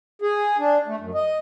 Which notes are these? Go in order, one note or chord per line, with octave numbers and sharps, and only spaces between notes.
G#4
D4
A3
F#2
D#5